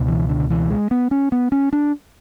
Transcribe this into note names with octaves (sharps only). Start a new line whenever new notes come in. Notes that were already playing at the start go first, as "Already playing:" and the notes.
Already playing: C#2 B2
E3
D3
E3
G#3
B3
C#4
B3
C#4
D4